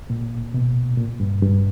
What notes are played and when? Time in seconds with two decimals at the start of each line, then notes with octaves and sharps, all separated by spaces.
0.10 A#2
0.54 B2
0.98 A#2
1.20 G2
1.42 G2